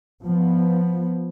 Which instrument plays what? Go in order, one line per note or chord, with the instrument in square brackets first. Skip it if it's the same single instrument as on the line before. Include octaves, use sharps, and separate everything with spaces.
[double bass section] F3 B3